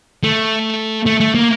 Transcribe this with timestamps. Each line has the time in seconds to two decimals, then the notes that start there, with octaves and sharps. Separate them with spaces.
0.24 A3
1.06 A3
1.20 A3
1.34 A#3